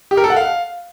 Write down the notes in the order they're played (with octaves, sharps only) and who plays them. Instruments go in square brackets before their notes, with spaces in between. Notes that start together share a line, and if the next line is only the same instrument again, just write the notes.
[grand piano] G4
A#4
A4
F#5
F5